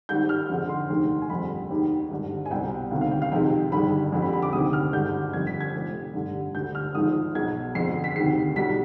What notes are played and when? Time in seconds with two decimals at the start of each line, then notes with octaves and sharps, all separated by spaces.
0.09 G#1 G#2 G3 G6
0.29 F6
0.50 F2 D3 G#3
0.69 C6
0.89 F1 D#2 D#3 G#3
1.22 G#5
1.30 G1 F2 D3 G3 B5
1.71 D#2 D#3 G#3
2.11 G#1 G2 D3
2.46 G#5
2.51 C2 B2 G3 G5
2.91 D2 C3 D#3 G3 F5
3.01 F5
3.11 G5
3.22 F5
3.32 F2 C3 D#3 G#3 G5
3.72 G1 G2 D#3 G#3 B5
4.12 F2 D3 G3
4.22 B5
4.33 B5
4.42 D6
4.53 D2 C3 D#3 G#3 D#6
4.73 F6
4.93 G#1 G2 D3 G#3 G6
5.33 G1 F2 D3 G3 G#6
5.47 B6
5.61 G#6
5.74 F1 F2 C3
6.14 G1 G2 D3 G3
6.54 D2 D3 G3 G6
6.75 F6
6.94 G#1 G#2 F3 G#3 D#6
7.35 B1 B2 G#3 G#6
7.75 F2 D3 G#3 C7
8.04 B6
8.16 D2 C3 D#3 G#3 C7
8.56 B1 B2 G3 B6